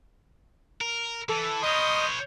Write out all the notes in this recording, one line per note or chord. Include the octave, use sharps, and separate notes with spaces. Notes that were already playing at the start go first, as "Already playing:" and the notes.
A#4
E3 A4
A#4 B4 C#5 D#5 C6 D#6 G6